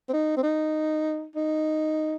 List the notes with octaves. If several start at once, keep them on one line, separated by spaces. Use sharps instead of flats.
C4
D#4
C4
D#4
D#4